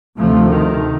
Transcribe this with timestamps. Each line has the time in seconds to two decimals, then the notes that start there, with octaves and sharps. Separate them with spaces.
0.17 D2 C3 F3 A3
0.49 D#3